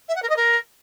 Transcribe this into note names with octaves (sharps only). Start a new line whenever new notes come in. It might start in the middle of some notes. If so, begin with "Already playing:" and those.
E5
F#5
A#4
D#5
A#4